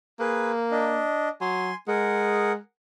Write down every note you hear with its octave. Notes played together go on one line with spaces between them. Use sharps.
A#3 G#4 B4
D4 D#5
F#3 G#5 C6
G#3 G#4 A#4 F#5